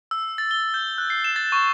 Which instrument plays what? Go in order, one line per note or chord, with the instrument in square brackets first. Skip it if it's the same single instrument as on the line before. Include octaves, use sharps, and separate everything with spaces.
[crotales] E6
A6
G7
G6
F#6
C7
E7
A6
C#6